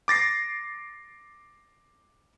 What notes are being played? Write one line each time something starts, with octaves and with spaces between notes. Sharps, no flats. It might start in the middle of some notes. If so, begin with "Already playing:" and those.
D6 A6 A#6 C7